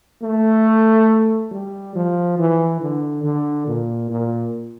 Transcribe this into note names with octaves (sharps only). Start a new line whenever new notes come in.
A3
G3
F3
E3
D3
D3
A#2
A#2